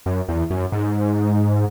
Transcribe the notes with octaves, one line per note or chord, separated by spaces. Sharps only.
F#2
E2
F#2
G#2